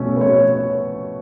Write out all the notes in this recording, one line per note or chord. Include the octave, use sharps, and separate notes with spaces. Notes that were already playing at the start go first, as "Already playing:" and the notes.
Already playing: B2 A3 C#4
B4
C#5